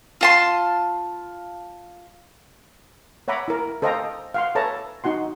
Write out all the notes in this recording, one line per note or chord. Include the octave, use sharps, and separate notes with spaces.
F4 A5 C6
C#5 E5 F#5 A#5 B5 D6
E4 A#4
A4 C5 D#5 F5 G5 A#5
F5 F#5 C6
A4 B4 C#5 E5 A5 A#5
D#4 F#4 F#5 C6